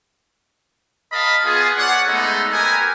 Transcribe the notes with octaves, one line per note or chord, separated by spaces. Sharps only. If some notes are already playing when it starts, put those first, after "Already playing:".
A#4 D#5 F5 A5 B5
B3 F4 G#4
C#5 D5 F#5
G#3 A3 B3 D#4 A4
G4 A#4 B4 G#5